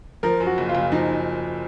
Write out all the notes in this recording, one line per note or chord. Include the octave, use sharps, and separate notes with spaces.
F3 A#4
F#2
F#4
F#1
F4
F#1
F3 D#4